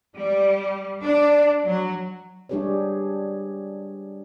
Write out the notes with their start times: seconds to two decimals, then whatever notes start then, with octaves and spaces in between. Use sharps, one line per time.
0.17 G3
1.03 D4
1.65 F#3
2.49 G3 D4 G4 G#4 B4 C#5